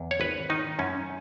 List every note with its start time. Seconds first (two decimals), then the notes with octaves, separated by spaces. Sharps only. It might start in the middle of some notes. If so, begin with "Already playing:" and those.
Already playing: E2
0.11 C#5
0.20 G#1 B4
0.50 D#3 D#4
0.79 F#2 C#4